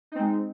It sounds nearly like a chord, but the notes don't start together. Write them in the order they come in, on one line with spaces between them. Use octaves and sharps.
D#4 C4 G#3